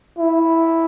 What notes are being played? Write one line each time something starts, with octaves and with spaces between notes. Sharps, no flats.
E4